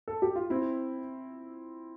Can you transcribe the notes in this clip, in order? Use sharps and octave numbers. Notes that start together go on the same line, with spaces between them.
A4
G4
F4
C4 E4